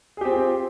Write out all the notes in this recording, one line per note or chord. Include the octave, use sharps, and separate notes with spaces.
C4 F4 G4 G#4